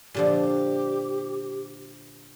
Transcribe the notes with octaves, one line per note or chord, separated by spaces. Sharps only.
A#2 D3 F3 G4